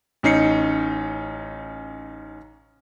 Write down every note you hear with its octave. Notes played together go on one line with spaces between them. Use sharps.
A1 C#4 D#4 C7 C#7